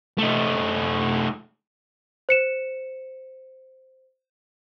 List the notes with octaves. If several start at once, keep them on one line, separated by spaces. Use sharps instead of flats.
A3 D#4
C5 C#7 E7